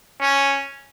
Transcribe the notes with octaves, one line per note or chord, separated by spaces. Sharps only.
C#4